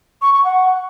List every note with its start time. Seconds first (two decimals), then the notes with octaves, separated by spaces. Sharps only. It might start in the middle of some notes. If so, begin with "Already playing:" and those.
0.22 C#6
0.33 C#6
0.44 F#5